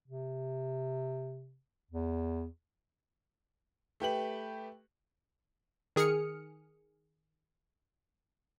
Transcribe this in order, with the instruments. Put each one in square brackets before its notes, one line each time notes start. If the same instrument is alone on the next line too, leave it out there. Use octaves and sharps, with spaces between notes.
[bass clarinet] C3
E2
[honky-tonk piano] A3 G4 B4 F#7
[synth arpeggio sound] D#3 G#4 D#6 F6 C#7